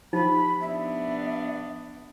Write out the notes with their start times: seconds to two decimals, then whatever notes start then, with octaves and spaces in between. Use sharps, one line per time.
0.13 F3 D#4 G4 C5 B5
0.61 B3 D4 E5